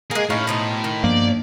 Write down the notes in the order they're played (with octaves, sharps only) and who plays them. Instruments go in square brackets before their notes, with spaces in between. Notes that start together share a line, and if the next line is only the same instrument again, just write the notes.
[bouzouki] G#3 A#3 [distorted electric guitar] G#4
[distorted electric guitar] A2 [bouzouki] C#4 D#4 F5
[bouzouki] B2 F3 D#4
D#3
[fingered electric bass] G2 F3 B3 [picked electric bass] A#3 [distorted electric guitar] D5